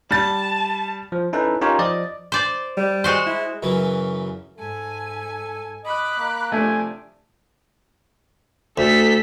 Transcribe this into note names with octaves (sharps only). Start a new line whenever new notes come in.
G3 A5 A6
F3
C#4 D#4 E4 A4 B4
C#4 D#4 F4 G4 A#4 C#5
F3 D5 D#5
C5 D5
G3
G#3 F#4 C5
E4
F#2 C#3 E3
G#2 A4 G#5
D#5 B5 D6 F#6
A#3
C3 F3 A3 D4 G#5
D2 A4 B6